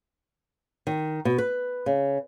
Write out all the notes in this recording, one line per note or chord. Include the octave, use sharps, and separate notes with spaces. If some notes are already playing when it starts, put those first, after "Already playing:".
D#3
B2
B4
C#3